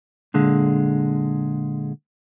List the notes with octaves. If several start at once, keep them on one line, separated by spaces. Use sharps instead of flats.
A#2 D3 G#3